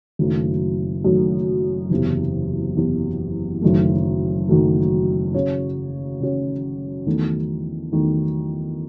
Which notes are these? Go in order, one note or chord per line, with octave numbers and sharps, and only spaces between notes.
F#1 F#2 D#3 F#3 A3
F#1 F#2 D#3 F#3 A3
F#1 E2 C3
F#1 E2 C3
F#1 F#2 D#3 F#3 A3
F#1 F#2 D#3 F#3 A3
C#3 F#3 C#4 F#4 C#5
C#3 F#3 C#4 F#4 C#5
E2 D#3 F#3 A3
E2 D#3 F#3 A3